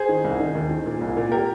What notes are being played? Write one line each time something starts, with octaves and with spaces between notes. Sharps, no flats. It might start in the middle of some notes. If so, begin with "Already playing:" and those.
Already playing: G#4 C5
D#3
C2
D#3
D#2
D#3
A#2
C2
A#2
G4 A#4